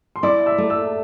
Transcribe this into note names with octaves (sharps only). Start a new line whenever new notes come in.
C6
E4 D5 D6
E5 E6
A3
E5 E6